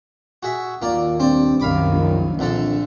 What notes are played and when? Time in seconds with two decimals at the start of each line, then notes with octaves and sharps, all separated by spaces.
0.43 F#4 G#4 E5
0.82 D#2 A#2 A#3 D5
1.20 G2 C4 D5
1.60 C2 F#2 D#3 F5 B5 D6
1.92 A#1
2.39 A#1 F2 D3 A4